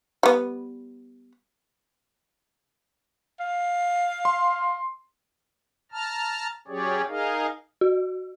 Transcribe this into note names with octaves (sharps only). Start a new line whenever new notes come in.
G3 B3
F5
C6
A5 A#5 F6
F#3 C#4 G4 G#4 C#5 D5
D#4 G#4 A#4 D#5 F5
F#4